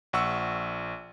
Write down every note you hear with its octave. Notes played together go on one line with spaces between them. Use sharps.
A#1 F#5 C#6 E6